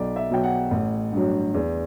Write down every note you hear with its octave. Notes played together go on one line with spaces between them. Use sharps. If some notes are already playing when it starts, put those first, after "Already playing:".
Already playing: B1 D5
E5
B2 F#3 G5
F#5
A1
G2 F#3
E2